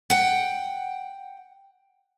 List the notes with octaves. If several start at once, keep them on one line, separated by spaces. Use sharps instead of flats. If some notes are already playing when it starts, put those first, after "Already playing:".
F#5 G5